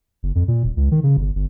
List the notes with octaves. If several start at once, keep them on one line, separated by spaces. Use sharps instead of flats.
F#1
F2
A#2
D#1
C#2
D#3
C#3
G1
G1